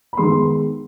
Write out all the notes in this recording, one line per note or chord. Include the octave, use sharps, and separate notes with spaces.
B5
D#3 G#3 B3 C6
C6